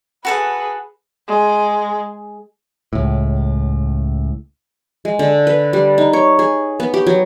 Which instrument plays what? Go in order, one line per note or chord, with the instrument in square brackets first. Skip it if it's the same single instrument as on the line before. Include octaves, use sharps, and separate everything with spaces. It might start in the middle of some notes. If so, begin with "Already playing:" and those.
[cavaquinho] F#4 A4 F#5 [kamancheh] G#4 B4
[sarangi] G#3
[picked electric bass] C#2 A2
[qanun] G#3
D3
B4
G3
D#4
C#5
G#4
B3
G4
F#3